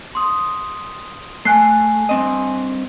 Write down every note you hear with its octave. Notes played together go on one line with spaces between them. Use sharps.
C6 D#6
A3 G#5 F#6 C7
G2 C4 D#5